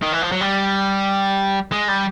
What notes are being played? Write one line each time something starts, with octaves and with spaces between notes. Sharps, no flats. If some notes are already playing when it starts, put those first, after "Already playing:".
D#3
E3
F3
F#3
G3
G#3
G3